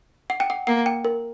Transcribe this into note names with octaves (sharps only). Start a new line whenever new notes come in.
F#5
G5
F#5
A#3 F#5
G5
A#4